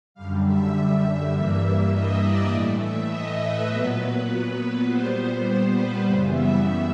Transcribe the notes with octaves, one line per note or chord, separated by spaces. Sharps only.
F#2 D3 G3 F5
E5
G2 E3 G3 A#3 E5
D#5
D5
A2 E3 A3
E5
D#5
B4
A#2 F#3 B3 B4
A#2 G3 B3 C5
C5
B4
F#2 C#3 E3 G3 B3 C5
E5